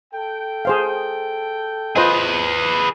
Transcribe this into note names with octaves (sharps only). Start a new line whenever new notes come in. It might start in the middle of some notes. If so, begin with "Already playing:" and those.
A4 G5
G#4 C5 F5
F4 G#4 B4 C5 D#5